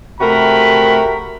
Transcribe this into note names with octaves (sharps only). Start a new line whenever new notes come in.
C3 A3 F#4 A#4 B5